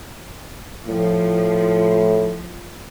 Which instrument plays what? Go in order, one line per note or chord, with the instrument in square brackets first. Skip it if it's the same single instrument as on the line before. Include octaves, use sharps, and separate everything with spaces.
[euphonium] A2 [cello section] F3